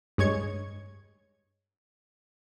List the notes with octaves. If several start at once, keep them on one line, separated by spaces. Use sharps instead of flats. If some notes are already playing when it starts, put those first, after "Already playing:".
G2 G#3 C#5 G#6 C#7